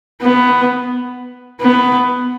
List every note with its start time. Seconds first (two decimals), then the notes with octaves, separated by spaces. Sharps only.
0.22 B3
1.62 B3